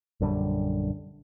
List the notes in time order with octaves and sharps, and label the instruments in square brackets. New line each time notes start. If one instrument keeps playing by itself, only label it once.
[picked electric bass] A#1 F#2 D3 G3